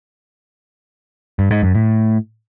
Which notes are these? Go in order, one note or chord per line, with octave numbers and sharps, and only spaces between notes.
G2
G#2
F#2
A2